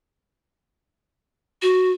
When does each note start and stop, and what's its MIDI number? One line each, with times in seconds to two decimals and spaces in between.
1.62 1.92 66